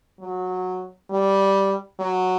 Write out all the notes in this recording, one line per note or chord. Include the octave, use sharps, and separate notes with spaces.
F#3
G3
F#3